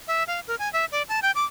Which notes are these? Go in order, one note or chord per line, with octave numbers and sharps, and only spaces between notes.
E5
F5
A#4
G#5
E5
D5
A5
G5
D6